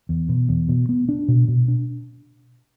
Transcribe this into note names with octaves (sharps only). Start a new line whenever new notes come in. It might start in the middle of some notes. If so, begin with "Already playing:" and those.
E2
B2
E2
B2
B3
D4
B2
B2
D4